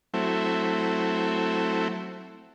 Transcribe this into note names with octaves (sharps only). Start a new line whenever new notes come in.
F#3 A3 C4 E4